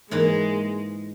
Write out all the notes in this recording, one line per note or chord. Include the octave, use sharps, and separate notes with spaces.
G#2 E3 G#3 A#3